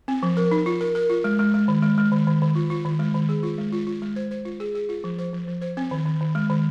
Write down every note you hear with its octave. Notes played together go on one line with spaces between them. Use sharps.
C4
F3
A#4
D#4
F4
A#4
A#4
F4
G#3
G#3
G#3
D#3
G#3
G#3
D#3
D#3
D#3
F4
F4
D#3
G#3
D#3
G#4
F4
G#3
F4
F4
G#3
C5
C5
F4
G#4
G#4
F4
F3
C5
F3
F3
C5
C4
D#3
D#3
D#3
G#3
D#3